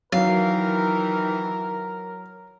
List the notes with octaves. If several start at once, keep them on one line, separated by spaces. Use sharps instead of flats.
D#3 E3 F#3 A#4 F5